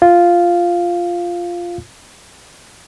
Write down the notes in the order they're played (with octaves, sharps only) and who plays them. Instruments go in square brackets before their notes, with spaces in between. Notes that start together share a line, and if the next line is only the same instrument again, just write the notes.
[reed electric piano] F4 F5